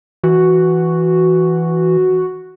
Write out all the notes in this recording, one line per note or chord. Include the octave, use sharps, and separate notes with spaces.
E3 F#4